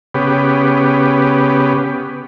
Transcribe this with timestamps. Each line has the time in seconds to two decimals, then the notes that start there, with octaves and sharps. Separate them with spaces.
0.14 C#3 B3 G4